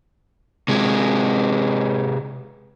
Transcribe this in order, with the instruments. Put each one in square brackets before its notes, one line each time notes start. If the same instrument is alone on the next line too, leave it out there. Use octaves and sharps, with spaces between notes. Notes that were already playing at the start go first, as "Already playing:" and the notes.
[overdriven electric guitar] C3 G#3